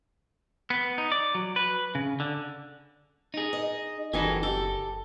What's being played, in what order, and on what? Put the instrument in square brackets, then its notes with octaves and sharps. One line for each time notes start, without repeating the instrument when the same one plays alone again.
[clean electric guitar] B3
D#4
D5
F#3
B4
C#3
D3
D#4 G#4
[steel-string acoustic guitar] D#5
[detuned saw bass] F#1 [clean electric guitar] E3 D#4 A4 [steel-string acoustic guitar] G3 F#4 G#4
[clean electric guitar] G4 [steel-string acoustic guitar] A4